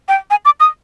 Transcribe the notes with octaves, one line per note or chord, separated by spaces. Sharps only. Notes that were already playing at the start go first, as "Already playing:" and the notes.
G5
G#5
D6
D#6